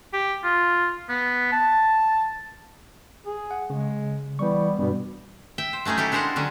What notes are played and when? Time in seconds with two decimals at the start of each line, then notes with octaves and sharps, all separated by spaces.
0.13 G4
0.44 F4
1.09 B3
1.52 A5
3.26 G#4
3.51 F#5
3.70 C#3 G#3
4.39 E3 G3 B3 C#6
4.79 G2 B2 G3 B3
5.58 E5 G5
5.73 C5
5.85 F#3 A3 C#4 D#4 G#4
5.98 C#4 E4 G4 A4
6.12 G#3 D4 G4 A#4 C5 F#5
6.36 D3 F#3 C#4